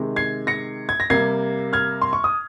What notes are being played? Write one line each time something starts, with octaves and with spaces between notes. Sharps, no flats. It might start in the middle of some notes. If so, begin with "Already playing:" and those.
Already playing: C3 D#3 G#3
G#6 C7
A#6 C#7
G#6
A#6
C3 G3 A#3 G#6 C7
F6 G#6
C6
C#6
D#6